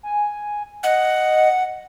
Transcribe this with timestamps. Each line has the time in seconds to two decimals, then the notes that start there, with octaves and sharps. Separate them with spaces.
0.03 G#5
0.83 D#5 F#5